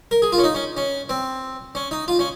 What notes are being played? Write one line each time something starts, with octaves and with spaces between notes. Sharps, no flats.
A#4
G#4
F4
C#4
D#4
C#4
C#4
C4
C#4
D#4
F4
C#4